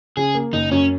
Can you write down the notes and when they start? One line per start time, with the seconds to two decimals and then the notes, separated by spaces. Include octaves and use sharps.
0.17 C#3 G#4
0.35 A#3
0.53 F#1 D#4
0.71 F#2 C#4